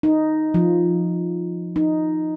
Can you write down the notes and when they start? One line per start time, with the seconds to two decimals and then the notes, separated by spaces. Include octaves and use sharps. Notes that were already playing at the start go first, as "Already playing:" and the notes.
0.03 D#4
0.54 F3
1.76 D#4